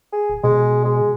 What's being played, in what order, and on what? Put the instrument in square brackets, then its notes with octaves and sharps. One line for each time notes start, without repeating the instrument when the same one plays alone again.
[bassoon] G#4
[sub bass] D1
[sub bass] B2 [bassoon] G#3
[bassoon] G#3